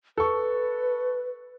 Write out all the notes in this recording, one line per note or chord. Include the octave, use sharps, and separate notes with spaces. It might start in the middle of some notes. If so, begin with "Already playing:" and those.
A4 B4 C#6